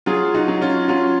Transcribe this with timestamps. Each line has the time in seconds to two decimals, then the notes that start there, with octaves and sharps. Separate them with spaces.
0.06 F#3 F4 G#4
0.35 D#4 F#4
0.48 F#3
0.62 C#4 F4
0.88 F#3 C#4 F4